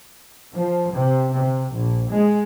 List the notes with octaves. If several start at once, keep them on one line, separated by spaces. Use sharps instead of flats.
F3
C3
C3
A#1
G#3